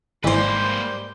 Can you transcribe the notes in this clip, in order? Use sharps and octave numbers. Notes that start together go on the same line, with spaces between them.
G#1 G#2 E3 G3 A#3 B4 C5 G6